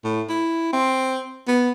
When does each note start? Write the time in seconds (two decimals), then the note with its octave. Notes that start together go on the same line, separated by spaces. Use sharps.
0.04 A2
0.29 E4
0.73 C4
1.48 B3